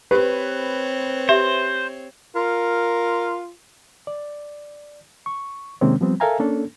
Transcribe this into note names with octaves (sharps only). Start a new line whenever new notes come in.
C4 G4 B4 C#5
G4 C5 E5
F4 A#4
D5
C#6
C3 D#3 G#3 A#3 C4 C#4
F3 G3 B3 C4
A4 A#4 E5 F5 G#5 A#5
A#3 C#4 D4 A4